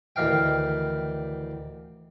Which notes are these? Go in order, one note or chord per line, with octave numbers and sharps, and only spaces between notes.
D2 D#3 E3 F5 G5